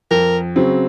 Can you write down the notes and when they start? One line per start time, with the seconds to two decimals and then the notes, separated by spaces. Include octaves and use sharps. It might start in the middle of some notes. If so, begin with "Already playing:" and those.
0.11 F2 A#4
0.56 C#3 F#3 C4